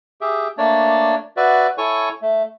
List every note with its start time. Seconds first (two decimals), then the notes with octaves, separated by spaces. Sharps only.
0.21 G4 G#4 E5
0.58 A3 A#3 D4 C#5 D5
1.37 F#4 B4 D5 E5
1.78 E4 A4 C#5 G#5 C#6
2.22 A3